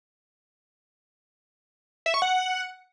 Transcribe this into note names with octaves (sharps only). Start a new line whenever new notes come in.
E5
C#6
F#5